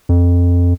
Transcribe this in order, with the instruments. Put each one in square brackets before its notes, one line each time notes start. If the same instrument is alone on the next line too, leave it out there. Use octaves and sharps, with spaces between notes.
[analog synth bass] F2